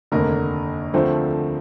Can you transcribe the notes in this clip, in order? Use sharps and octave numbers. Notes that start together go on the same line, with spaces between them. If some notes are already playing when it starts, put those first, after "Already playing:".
F1 D#2 D3 A#4
D2 D3 F3 A3 C4